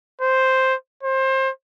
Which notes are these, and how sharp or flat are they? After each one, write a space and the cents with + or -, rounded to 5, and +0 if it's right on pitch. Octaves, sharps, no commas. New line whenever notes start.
C5 +0
C5 +25